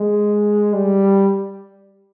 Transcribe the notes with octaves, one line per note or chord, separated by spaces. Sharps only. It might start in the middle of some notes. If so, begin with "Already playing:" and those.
Already playing: G#3
G3